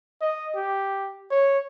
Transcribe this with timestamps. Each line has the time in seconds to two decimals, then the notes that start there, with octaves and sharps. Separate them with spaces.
0.21 D#5
0.55 G4
1.31 C#5